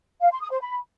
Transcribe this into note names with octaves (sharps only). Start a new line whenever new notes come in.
F5
C6
D#6
C5
B5